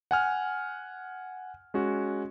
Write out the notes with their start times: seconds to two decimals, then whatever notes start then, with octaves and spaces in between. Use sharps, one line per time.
0.11 F#5 G#5 F6
1.74 G#3 C#4 F#4